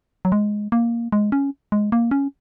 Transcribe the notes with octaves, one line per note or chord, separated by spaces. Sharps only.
F#3
G#3
A#3
G#3
C#4
G#3
A#3
C#4